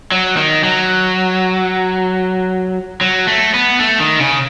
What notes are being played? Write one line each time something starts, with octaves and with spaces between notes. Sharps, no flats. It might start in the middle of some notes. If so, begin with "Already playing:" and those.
F#3
D#3
F#3
F#3
A3
B3
A3
D#3
C#3